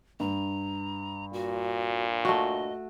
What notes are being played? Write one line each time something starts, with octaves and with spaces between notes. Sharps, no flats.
G2 A#5
A#2 F#4
A3 F#4 D#5